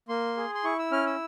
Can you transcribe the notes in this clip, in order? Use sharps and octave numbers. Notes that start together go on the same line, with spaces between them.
A#3 C6
G#4
C6
E4 C#6
E6
C#4 F6
E6